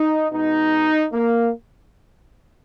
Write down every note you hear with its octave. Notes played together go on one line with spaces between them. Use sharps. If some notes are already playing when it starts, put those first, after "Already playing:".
Already playing: D#4
B2 G#3 D#4
A#3